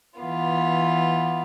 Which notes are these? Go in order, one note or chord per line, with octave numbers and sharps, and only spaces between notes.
E3 B3 F4